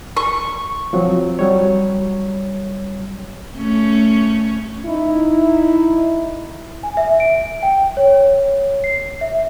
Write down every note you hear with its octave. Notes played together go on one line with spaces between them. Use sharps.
C#6
F3 F#3 C4
F#3 G3 C#5
A3 C#4
D#4 E4
G#5
E5
D7
G5
C#5
C7
E5